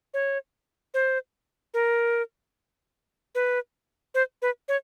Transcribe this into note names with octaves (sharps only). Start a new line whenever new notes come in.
C#5
C5
A#4
B4
C5
B4
C#5